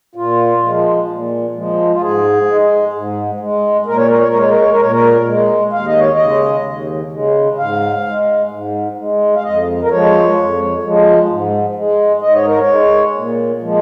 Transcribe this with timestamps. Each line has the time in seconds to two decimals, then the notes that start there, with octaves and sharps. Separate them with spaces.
0.15 A#2 F4
0.63 F3 G#3
1.09 A#2
1.55 F3 G#3
1.92 F4
2.01 G#2 G#4
2.48 G#3
2.94 G#2
3.40 G#3
3.86 A#2 A#4
3.97 C#5
4.08 A#4
4.18 C#5
4.28 A#4
4.33 G#3
4.39 C#5
4.50 A#4
4.60 C#5
4.71 A#4
4.80 A#2 C#5
4.91 A#4
5.26 G#3
5.73 D#2 F5
5.86 D#5
5.99 C#5
6.13 D#5
6.19 C#3 G#3
6.65 D#2
7.12 C#3 G#3
7.57 G#2 F5
8.05 G#3
8.51 G#2
8.98 G#3
9.36 F5
9.44 F2 D#5
9.83 A#4
9.90 F3 G#3 C#5
10.37 F2
10.82 F3 G#3
11.29 G#2
11.75 G#3
12.22 G#2 D#5
12.34 C#5
12.47 A#4
12.59 C#5
12.68 G#3
13.15 A#2
13.61 F3 G#3